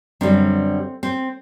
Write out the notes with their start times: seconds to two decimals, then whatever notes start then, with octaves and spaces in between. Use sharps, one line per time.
0.21 F#2 D3 G3 C4
1.03 C4